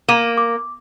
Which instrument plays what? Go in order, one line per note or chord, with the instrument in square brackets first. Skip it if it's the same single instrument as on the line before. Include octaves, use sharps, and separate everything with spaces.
[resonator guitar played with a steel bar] A#3 [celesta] D6 D#7 E7
[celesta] D6